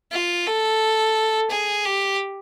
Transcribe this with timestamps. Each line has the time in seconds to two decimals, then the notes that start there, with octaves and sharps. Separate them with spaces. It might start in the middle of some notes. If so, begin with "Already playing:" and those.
0.12 F4
0.46 A4
1.51 G#4
1.85 G4